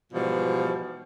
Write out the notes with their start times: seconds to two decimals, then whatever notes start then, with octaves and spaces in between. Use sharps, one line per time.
0.13 G#2 B2 E3 F3 G3